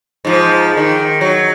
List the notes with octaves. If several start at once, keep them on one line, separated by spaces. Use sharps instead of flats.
G#2 F3
D#3
F#3